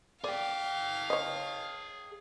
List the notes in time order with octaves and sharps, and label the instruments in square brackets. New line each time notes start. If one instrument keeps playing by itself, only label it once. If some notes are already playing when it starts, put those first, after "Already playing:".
[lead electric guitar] G#4 G5 [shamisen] D5 [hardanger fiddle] F5
[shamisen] C#5 D#5